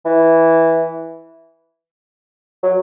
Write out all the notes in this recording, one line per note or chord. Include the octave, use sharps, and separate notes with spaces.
E3
F#3